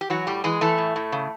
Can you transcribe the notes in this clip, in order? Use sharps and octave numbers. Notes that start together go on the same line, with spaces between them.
G4
E3 F#3 F#4
A2 G3 G4
E3 G#3 G#4
E3 A3 A4
A2
A2
C#3